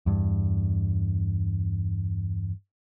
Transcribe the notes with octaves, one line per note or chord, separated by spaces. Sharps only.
E2 G2